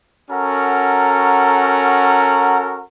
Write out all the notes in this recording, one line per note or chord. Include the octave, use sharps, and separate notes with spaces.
C#4 F#4 A4 A#4 F#5 A#5